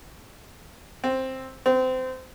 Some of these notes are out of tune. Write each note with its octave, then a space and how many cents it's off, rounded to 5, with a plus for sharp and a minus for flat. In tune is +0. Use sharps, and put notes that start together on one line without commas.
C4 +5
C4 -25